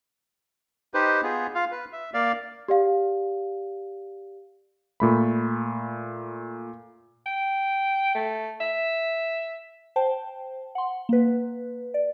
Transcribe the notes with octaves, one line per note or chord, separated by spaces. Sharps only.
D#4 G4 B4 C5
B3 F4 G#4
F4 F5
B4
E5
A#3 D5 F5
G4 D5 F5
A#2 A3 B5
G5
A3
E5
C5 G5 A5
F#5 C6
A#3 B4
D5